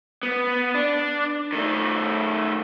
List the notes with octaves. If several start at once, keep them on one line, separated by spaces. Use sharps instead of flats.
B3
D4
D#3 A3